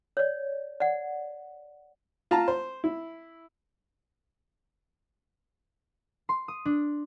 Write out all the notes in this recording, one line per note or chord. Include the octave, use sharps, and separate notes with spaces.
C#5 D5
D5 F#5
F4 A5 A#5
C5
E4
C6
D#6
D4